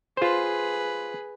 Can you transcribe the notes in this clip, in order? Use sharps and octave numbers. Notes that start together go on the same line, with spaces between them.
F4 G#4 B4 C5